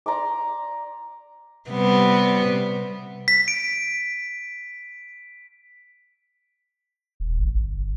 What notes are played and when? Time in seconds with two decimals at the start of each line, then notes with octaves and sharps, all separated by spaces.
0.06 D5 A#5 C6 D6
1.70 C3 G3 B3
3.28 B6
3.48 D7
7.20 D#1
7.39 A1
7.55 G1